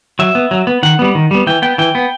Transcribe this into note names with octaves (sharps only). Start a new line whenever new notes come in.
F#3 E5
B3
F#3
B3
D#3 F#5
G3 B3
D#3
G3 B3
E3 G5
B3 G5
E3 G5
B3